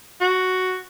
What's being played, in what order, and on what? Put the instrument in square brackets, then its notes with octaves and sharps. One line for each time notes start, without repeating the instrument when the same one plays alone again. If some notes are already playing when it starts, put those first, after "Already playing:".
[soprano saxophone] F#4